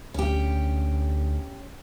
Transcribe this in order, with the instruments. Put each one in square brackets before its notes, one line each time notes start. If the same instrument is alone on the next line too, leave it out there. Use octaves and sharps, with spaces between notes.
[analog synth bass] D2 [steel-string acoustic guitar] C#4 G4